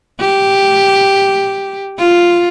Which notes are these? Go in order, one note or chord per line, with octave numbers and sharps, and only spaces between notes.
G4
F4